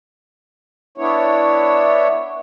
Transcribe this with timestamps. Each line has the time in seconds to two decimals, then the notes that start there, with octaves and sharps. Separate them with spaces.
0.98 B3 D4 E4 C#5